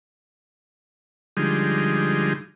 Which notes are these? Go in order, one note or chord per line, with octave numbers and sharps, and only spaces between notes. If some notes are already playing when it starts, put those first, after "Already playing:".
D3 F3 G3 G#3 D#4